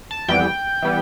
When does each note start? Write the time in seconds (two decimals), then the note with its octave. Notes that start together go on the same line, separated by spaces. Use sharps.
0.11 A5
0.28 F2 E3 G3 B3 G5
0.82 E3 G3 B3